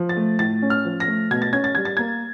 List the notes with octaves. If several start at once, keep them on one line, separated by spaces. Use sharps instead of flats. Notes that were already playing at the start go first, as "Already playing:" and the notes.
Already playing: F3
A6
A3
A2 A6
C#4
F6
F3
A#6
A3
B2 G#6
A6
C#4 G#6
A6
G3 G#6
A6
A#3 G#6